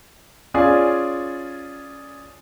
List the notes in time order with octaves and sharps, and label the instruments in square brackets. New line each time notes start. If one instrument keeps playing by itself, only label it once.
[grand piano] C#4 F4 G#4 D5